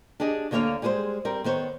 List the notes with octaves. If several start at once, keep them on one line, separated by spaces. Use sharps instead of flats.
D4 G4 G#4 D#5
D2 D3 A#3 B3 C#5 F5
G3 G#3 G#4 A#4 C5
G3 C4 A#4
D#3 B3 C5 C#5